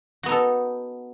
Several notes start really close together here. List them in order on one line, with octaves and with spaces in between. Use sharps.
F#4 B3 D#4 A4